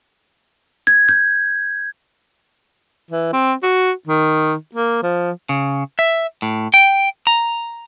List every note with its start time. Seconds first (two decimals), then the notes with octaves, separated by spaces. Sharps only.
0.87 G#6
1.09 G6
3.11 E3
3.33 C4
3.63 F#4
4.07 D#3
4.75 A#3
5.03 F3
5.49 C#3
5.99 E5
6.42 A2
6.74 G5
7.27 A#5